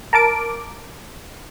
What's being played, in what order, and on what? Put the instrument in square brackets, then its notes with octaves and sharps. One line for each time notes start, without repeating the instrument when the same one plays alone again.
[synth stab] A#4 A5 D6 D7